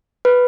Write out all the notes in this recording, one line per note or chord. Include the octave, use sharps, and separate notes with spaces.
B4